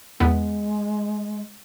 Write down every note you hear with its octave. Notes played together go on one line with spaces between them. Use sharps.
E2 G#3 B3